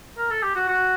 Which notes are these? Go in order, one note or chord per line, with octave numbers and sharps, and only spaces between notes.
A#4
A4
G4
F#4
F#4